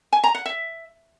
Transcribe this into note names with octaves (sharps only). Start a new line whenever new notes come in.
G#5
A#5
F#5
E5